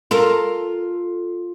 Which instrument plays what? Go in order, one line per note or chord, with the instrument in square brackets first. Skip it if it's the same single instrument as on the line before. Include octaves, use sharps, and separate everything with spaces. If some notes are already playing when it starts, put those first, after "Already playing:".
[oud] F4 A4 A#4